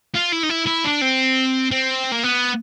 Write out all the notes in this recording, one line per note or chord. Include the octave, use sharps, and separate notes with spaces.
F4
E4
D#4
E4
E4
D4
C4
C4
A#3
B3